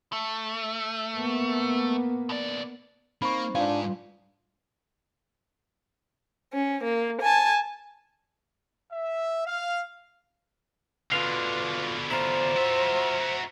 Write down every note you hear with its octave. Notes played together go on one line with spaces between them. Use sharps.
A3
A#3 B3
B2 D5
A#3 C4 D#4 C5 B5 C#6
G#2 D4 F4 B4 F5 G#5 C6
C#4
A#3
G#5 A5
E5
F5
B2 D3 F4 B4 F5
E4 F4 C5 A#5
F#4 E5